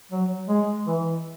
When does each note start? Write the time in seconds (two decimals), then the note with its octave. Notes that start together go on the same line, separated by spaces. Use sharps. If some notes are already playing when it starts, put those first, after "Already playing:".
0.12 F#3
0.48 G#3
0.87 E3